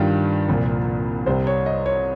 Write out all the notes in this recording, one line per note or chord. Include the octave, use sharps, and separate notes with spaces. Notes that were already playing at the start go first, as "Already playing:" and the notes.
Already playing: G2 D#3 G3 F4
C2 A#2 F3
C2 C3 G3 C5
C#5
D#5
C#5